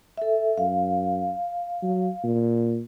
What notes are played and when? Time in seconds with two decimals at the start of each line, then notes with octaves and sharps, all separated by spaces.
0.18 A4 E5
0.58 F#2 F5
1.82 F#3
2.24 A#2